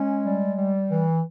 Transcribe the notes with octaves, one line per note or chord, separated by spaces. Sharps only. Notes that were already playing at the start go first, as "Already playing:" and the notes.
Already playing: G#3 C#4
G3
G3
E3